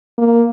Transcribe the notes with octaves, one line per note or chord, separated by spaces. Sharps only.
A#3